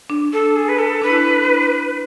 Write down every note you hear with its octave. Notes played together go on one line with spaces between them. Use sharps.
D4
A4
G#4
B4
A4
D4 B4
E4
D4